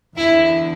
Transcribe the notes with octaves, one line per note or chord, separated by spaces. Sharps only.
E2 D3 E4 E5